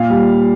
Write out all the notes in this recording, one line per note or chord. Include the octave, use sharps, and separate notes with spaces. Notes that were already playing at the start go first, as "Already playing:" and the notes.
Already playing: A#2 F5
G3